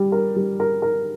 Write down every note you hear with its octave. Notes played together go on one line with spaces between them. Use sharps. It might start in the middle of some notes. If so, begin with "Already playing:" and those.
Already playing: G3
A#4
G3
A#4
A#4